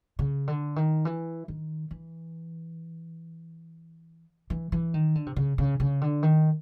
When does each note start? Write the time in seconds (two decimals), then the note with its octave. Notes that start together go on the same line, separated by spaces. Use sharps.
0.19 C#3
0.47 D3
0.76 D#3
1.05 E3
1.48 D#3
1.91 E3
4.50 E3
4.72 E3
4.94 D#3
5.15 D3
5.26 C3
5.36 C#3
5.58 C#3
5.80 C#3
6.01 D3
6.23 D#3